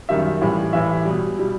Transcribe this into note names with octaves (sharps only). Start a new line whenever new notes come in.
F#2 D#3 G3 E5
A2 E3 G3
A2 E3 G3 E5
B2 G3
B2 G3